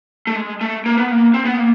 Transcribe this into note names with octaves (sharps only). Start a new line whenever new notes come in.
A3
G#3
A3
A#3
B3
A#3
C4
B3
A#3